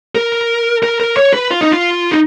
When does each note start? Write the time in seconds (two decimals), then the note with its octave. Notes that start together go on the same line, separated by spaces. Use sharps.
0.15 A#4
0.83 A#4
1.00 A#4
1.17 C#5
1.33 B4
1.51 F4
1.61 D#4
1.71 F4
2.12 D#4